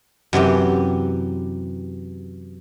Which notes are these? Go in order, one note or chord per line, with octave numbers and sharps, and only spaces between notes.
F#2 C3 E3 G4